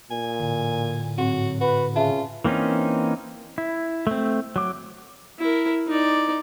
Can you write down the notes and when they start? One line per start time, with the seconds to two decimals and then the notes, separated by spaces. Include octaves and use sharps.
0.11 A#2 G#5
0.40 A2 D3
1.18 G#2 F#3 C4 F#4
1.61 F#4 B4
1.96 C#3 F4 E5 A5
2.44 E3 A#3 C4 C#4 D#4
3.58 E4
4.07 A3 C4
4.56 F#3 D6
5.39 E4 A#4
5.88 D#4 D5